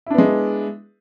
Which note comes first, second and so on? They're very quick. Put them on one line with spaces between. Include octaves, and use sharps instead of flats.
E4 D4 B3 G#3